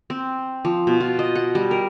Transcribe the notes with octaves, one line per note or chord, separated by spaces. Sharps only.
C4
F3
B2
F4
D#5
F#5
G3
A#4